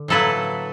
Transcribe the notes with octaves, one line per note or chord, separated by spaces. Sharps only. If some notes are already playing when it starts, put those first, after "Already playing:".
Already playing: D3
A2 F#3 A#3 A4 B4